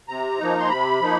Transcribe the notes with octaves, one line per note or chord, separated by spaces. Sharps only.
C3 A#5
F3 A#3 D#4
C6
C3 B5
F3 A#3 D#4